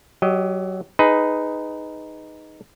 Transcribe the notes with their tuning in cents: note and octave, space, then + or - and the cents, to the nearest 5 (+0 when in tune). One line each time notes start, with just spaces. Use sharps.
F#3 +20 G4 +0 D#5 +0
D#4 +0 G#4 +5 B4 +15